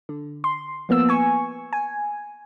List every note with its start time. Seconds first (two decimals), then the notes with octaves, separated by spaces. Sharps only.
0.09 D3
0.44 C6
0.89 F3 A#3 B3 E6
1.09 G#5 C#6
1.73 G#5